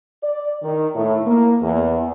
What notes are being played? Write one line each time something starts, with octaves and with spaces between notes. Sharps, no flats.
D5
D#3
A2
A#3
E2